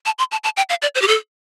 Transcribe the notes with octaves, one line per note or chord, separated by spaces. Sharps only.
A5
C6
A5
A5
G5
F5
D5
C5
G4
A4